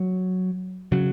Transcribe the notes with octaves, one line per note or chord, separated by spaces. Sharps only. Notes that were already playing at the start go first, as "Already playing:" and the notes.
Already playing: F#3
C#3 F#3